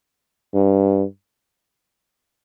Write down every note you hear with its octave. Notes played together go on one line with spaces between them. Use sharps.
G2